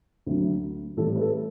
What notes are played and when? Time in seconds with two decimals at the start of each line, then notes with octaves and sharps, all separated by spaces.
0.26 D2 D3 F#3
0.97 A2 E3 G3 A4
1.16 B4
1.21 A4